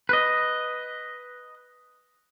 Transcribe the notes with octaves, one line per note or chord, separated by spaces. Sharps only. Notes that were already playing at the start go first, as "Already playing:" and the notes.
B4 D#5